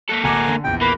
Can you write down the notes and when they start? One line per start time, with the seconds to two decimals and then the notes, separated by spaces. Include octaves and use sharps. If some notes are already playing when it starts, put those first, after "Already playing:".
0.09 A#3 A4 F#6 B6
0.24 D1 F#5 G#5 A#5 D6
0.48 D3
0.64 A#1 E2 G5
0.81 A#3 B4 B5